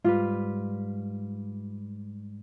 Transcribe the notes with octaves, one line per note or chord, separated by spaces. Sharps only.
G#2 G3 F4 B4